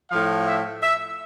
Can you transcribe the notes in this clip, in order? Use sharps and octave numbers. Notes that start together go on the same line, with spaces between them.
A2 F3 F5
E5
E5